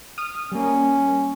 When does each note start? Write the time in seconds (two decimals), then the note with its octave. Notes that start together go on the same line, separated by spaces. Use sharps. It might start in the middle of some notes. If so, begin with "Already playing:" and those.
0.18 D#6 F6
0.52 G3 A#3 C#4